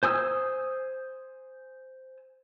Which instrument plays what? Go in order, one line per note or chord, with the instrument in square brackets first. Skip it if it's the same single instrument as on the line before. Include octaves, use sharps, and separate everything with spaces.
[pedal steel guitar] C5 G#5 D#6 E6